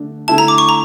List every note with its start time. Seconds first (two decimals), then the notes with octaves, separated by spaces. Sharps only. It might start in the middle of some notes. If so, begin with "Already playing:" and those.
Already playing: D3 A3 D4
0.28 D3 A3 E4 A5
0.38 A#5
0.48 D6
0.58 C#6
0.69 A#5